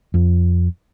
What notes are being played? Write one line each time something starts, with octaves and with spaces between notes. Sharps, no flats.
F2